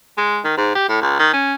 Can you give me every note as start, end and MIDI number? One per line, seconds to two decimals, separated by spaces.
0.18 0.39 56
0.45 0.53 51
0.57 0.72 44
0.75 0.86 67
0.89 0.99 45
1.01 1.16 37
1.19 1.30 51
1.33 1.55 61